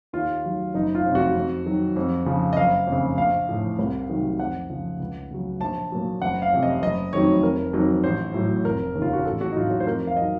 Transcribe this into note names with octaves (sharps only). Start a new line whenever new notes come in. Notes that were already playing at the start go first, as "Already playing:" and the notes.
D#2 F4
D#3 F#3
F#1 D#4
F4
F2 C3 F3
F#4
F2
D#3 F#3
F2
C#3 F3
D#5
F#1 F5
F2
C#3
A#1 F5
A2 F3
C2
C3 D#3 F#3
F2 F#5
C#3 F3
C#2
C#3 F#3
A#1 A5
A#2 F#3
F#1 F#5
F5
F2 C3 F3
D#5
F#1 D#5
F2 D#3 F#3 C#5
F1 A#4
F2 D#3 F#3
A1 C5
A2 F#3
F1 A#4
D#2 C#3
F4
F#4
A1 A4
F#4
D#4
A2 F#3 F4
F#4
C5
F2 A#4
F5
D#3 F#3 D#5